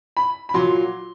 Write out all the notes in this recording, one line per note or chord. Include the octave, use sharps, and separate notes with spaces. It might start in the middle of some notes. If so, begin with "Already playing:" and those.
B5
B5
A#2 F#3 C6